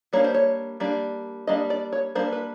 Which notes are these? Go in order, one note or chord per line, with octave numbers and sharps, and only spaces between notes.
G3 A#3 D4 C#5
C5
C#5
G3 A#3 D4
G3 A#3 D4 D#5
D5
C#5
G3 A#3 D4 C5
B4